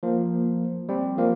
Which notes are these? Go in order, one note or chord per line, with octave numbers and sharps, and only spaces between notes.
F3 A#3
G3 C4
F3 A#3